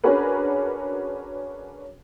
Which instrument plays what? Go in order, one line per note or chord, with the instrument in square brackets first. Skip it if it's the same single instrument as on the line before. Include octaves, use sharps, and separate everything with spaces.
[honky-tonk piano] C#4 D4 F#4 G#4 A#4 B4